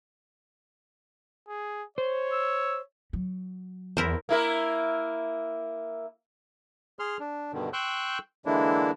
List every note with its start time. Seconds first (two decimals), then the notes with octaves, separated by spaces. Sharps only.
1.48 G#4
1.98 C5 C#5
2.32 E6
3.13 F#3
3.97 E2 E4 A#4 C5
4.29 A#3 E4 A#4
6.99 G#4 C6 F6
7.20 D4
7.53 G2 B2 D3 D#3
7.73 G5 C6 C#6 E6 F#6 G6
8.46 D3 E3 G#3 A#3 D4 E4